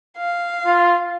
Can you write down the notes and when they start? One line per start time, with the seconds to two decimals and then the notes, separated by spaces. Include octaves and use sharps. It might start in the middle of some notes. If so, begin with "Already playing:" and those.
0.17 F5
0.66 F4